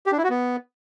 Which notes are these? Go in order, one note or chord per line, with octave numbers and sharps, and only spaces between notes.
G4
D4
E4
F#4
B3